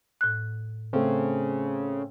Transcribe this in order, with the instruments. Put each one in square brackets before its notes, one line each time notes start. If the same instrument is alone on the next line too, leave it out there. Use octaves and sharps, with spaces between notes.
[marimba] A2 F#6
[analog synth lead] C#3 [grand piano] A3 C4